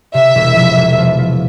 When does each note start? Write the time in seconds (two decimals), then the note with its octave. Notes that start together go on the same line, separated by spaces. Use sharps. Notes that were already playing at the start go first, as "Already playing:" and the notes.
0.14 C3 E5
0.35 E1
0.56 F3
0.76 E1
0.99 F3
1.19 F3